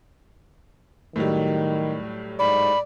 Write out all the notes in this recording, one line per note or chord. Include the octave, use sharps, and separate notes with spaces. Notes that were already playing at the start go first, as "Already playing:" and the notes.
A2 D#3 F#3 G3
G#2 D5 B5